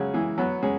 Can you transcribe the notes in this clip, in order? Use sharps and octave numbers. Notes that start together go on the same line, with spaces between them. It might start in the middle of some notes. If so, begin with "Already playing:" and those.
Already playing: C#3 F#3 G#3
E3 G#3
F#3 B3
G#3 C#4